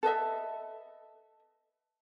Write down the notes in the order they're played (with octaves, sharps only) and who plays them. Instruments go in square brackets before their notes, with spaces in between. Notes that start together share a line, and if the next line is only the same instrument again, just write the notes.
[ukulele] A4 B4 D#5 E5